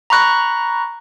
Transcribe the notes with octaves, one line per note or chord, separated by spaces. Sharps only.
A#5 B5 C#6 F#6 A#6